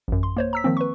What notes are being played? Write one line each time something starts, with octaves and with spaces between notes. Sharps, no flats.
A1 F#2
C6
A#3 C5 C#5
A#5 E6 B6
D#3 F3 A#3 C4
B4 C#6